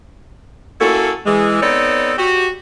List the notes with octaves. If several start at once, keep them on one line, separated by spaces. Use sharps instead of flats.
A#3 C#4 E4 F#4 A4
E3 G#3
B3 C4 D#4 A4 C#5 D5
F#4 G4